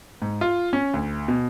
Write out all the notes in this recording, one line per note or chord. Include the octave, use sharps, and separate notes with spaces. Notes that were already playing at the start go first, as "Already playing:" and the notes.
G#2
F4
C#4
D2
B2